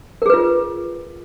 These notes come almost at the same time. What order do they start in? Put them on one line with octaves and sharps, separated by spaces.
A#4 G#4 B4 F4